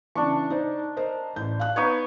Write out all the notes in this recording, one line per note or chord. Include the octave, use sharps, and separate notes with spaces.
C#3 E3 D4 C#6
D#4 C5 D5
A#4 C5 D#5
A1 G6
F5 F#6
B3 D#4 C#5